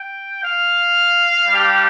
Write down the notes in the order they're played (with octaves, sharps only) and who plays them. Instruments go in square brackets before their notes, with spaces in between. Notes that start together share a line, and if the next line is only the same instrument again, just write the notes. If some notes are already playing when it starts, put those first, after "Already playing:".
Already playing: [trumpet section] G5
F5
G3 D4 G4